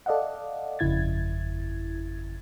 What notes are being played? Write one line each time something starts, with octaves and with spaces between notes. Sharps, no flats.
A4 D5 D#5 F5 F#5
G1 F2 C#3 E4 G#6 A6